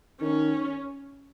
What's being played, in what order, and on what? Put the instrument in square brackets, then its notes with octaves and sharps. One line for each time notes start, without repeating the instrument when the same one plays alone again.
[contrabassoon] D#3 [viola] C#4